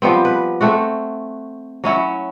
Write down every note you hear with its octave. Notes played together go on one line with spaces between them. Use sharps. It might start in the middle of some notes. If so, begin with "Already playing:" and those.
F3 G3 B3 C4
B4
A3 C4 F#4
F#3 C#4 E4